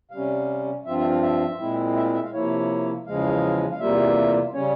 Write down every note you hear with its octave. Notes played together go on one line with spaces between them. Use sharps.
C3 G3 C#4 F5
G2 F3 C4 F4 E5
E5
F5
E5
A#2 G#3 C4 E4
E5
F5
E5
F5
C3 F3 A#3 E4 C#5
E2 C#3 F3 G#3 F5
F5
E2 C3 G3 A#3 F4 E5
C#3 G3 C#4 C#5